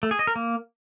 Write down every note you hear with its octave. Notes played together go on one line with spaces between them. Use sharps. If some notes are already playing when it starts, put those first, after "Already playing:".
A3
G#4
D#5
A#4
A#3